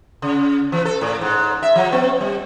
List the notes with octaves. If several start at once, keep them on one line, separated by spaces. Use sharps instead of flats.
C#3
E3
A4
A2
G#2
E5
F3
B3
G3